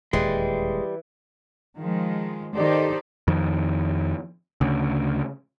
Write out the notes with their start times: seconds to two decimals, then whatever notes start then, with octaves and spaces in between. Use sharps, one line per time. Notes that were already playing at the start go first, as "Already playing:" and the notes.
0.13 D#1 E2 E3 G3 G#3
1.77 D#3 F3 G#3
2.55 D#3 D#4 G4 A4 C5 D5
3.28 F2 D#3
4.61 D2 C#3